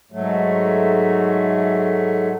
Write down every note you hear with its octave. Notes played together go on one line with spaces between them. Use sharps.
G#2 F#3 A3